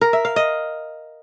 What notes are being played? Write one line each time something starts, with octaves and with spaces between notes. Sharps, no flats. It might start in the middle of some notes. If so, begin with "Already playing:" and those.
A#4
E5
F5
D#5